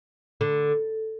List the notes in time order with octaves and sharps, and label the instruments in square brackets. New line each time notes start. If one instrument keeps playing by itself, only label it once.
[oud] D3